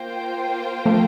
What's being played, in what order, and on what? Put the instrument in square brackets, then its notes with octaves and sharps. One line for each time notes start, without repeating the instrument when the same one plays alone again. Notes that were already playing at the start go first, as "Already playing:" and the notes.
Already playing: [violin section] A#3 F4 C5 G5
[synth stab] F3 A3